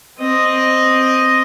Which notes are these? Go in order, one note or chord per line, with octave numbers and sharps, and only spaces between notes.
C4 D#5